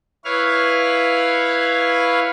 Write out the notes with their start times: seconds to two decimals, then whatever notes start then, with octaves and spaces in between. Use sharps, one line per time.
0.25 E4 B4 C#5 F5 F6